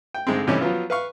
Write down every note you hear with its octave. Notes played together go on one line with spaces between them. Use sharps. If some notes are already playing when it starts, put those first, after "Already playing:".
G5
G#2 D3 G#3 A3 C4
A2 C3 E3 G3 C#4 D#4
F3 F#3 B3 F4
B4 F5 C#6